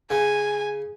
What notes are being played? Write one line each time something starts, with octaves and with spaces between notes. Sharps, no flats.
C#3 G#5